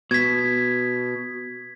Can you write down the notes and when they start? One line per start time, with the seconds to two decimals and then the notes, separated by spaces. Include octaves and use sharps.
0.11 B2 G#6 B6